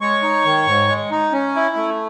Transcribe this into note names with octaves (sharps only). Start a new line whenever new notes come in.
G#3 C#5 C#6
D#4
D#3
G#2
G#3
D#4
C#4
E4
A3